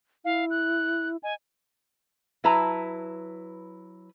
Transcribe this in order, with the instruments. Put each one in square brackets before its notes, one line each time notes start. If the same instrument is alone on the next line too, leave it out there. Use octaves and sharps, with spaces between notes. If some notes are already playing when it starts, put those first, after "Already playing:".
[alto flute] E4 [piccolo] F5
[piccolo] F#6
[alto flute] D#5 [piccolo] G#5
[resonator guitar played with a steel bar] F#3 E4 B4 A5 A#5